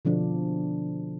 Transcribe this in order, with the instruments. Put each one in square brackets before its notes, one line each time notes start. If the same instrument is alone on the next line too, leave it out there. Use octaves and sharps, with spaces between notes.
[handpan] B2 D3 F3 D4